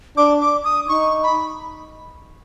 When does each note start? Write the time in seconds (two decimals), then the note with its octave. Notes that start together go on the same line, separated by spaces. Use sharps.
0.17 D4 D6
0.41 D6
0.64 D#6
0.88 D#4 C#6
1.23 B5